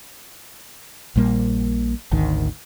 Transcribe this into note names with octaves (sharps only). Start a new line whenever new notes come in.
A#1 A#2 G3 A#3
G#1 D2 D#3